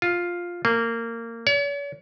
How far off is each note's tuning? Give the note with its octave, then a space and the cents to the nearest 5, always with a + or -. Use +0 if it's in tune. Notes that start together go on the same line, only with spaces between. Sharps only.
F4 +5
A#3 -20
C#5 +45